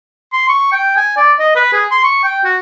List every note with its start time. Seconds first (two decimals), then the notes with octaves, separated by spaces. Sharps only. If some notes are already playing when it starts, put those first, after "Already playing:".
0.33 C6
0.49 C#6
0.72 G5
0.97 G#5
1.17 D5
1.39 D#5
1.55 B4
1.73 G#4
1.91 C6
2.04 C#6
2.24 G5
2.44 F#4